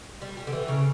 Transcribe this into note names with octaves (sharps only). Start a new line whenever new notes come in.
G3
G3
D3
E3
C#3